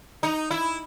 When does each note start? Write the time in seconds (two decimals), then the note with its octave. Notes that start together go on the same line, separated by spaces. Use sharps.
0.23 D#4
0.51 E4